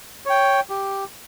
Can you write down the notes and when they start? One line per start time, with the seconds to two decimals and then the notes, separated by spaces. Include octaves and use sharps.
0.25 C#5 G5
0.70 G4